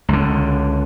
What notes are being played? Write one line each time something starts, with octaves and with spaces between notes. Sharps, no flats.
C#2 D3